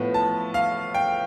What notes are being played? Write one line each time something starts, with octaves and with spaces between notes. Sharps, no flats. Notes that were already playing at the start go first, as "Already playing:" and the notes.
Already playing: A2 F3 B3
A5
F5
G5